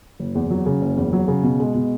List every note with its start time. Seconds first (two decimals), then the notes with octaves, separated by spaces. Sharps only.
0.20 F#1
0.35 E2
0.51 F#3
0.66 C#3
0.82 F#1
0.97 E2
1.13 F#3
1.28 C#3
1.43 B2
1.60 G#3
1.75 B2